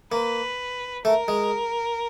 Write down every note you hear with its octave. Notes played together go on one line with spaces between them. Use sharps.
A#3 B4
A3 A#4
G#3